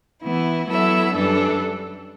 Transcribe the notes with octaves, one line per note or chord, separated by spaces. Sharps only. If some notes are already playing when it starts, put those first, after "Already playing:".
E3 B3 E4
F#3 B3 E4 A4 E5
F#2 E3 G3 D4 A4